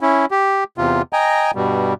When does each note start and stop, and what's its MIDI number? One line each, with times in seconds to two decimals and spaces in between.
0.01 0.26 61
0.01 0.26 64
0.31 0.64 67
0.78 1.02 40
0.78 1.02 48
0.78 1.02 65
1.13 1.51 75
1.13 1.51 79
1.13 1.51 80
1.13 1.51 82
1.55 1.94 43
1.55 1.94 47
1.55 1.94 55